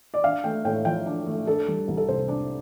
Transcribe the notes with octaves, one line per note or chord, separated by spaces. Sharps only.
D5
D4 F5
A3 G5
A2 G5
F3 G5
D4
A3
D4 A4
G3
C2
A4
C3 C5
D4